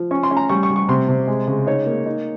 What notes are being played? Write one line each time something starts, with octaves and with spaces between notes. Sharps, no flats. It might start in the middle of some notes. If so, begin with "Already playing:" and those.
Already playing: F3
C#4 C#6
C6
C#4
A#5
G3 C#6
C#6
G3
C#6
C3 C6
C3
G#3
C#3
D#4 C#5
A#3
D#4